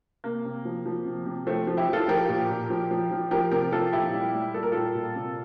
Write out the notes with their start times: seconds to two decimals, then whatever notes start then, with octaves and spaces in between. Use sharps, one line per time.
0.24 C3 A#3
0.45 C3
0.65 F3
0.86 F3
1.06 C3
1.26 C3
1.47 F3 A3 C4
1.67 F3
1.77 E4 G4
1.88 F3 F4 A4
2.08 F3 G4 A#4
2.29 A#2
2.50 A#2
2.70 F3
2.91 F3
3.11 F3
3.31 F3 G4 A#4
3.52 C3 G4 A#4
3.72 F3 F4 A4
3.93 A#2 E4 G4
4.13 G3
4.34 G3
4.54 A#2 A4
4.63 A#4
4.72 G3 F4 A4
4.95 A#2
5.16 C3